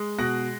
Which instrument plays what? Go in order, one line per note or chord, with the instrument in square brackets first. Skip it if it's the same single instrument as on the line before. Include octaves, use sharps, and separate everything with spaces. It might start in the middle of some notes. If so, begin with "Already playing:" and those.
Already playing: [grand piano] G#3
B2 F#6 A#6